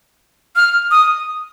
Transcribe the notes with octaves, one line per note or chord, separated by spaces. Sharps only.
F6
D#6